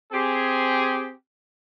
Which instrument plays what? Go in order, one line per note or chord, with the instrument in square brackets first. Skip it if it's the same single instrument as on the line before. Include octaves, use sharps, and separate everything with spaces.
[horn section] C4 G4 G#4